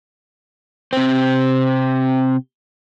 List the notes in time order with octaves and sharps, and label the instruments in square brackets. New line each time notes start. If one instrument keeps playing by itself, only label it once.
[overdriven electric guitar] C3 C4